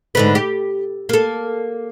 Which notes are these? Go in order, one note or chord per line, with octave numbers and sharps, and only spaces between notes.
G#2 D3 B4
G4
A#3 A4